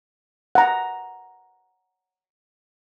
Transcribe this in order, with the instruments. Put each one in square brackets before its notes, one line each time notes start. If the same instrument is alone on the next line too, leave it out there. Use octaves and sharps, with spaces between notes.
[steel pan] F#5 A#5